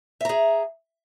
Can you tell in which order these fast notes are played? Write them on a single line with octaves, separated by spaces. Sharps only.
E5 A#5 G#4